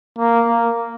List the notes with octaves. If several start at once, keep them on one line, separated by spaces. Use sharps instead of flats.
A#3
A#3